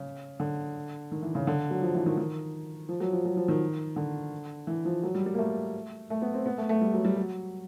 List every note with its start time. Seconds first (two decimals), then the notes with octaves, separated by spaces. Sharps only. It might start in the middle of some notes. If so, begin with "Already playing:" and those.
Already playing: C#3
0.40 D3
1.12 D#3
1.22 E3
1.35 C#3
1.47 D3
1.71 F#3
1.82 F3
1.95 E3
2.06 D#3
2.17 D#3
2.89 F3
3.00 F#3
3.13 F3
3.25 F#3
3.37 F3
3.48 D#3
3.96 D3
4.67 E3
4.85 F3
5.03 F#3
5.15 G3
5.26 G3
5.34 A#3
5.38 A3
6.10 A3
6.22 B3
6.34 C4
6.46 B3
6.58 A3
6.69 A3
6.81 G3
6.94 F#3
7.05 G3
7.17 F#3